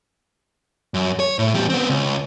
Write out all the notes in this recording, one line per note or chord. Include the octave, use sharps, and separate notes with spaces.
F#2
C#5
A2
E2 G3
B3 C4
C#2